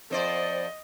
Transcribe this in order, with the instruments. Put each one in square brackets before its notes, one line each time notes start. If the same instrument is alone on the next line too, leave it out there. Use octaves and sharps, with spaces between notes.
[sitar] F2 C5 D5 [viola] D#5